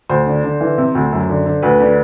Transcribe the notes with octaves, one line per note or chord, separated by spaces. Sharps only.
D2 C5
D3
D3
E3
C3
D2
F#2
D3
D3
D2 B4
D3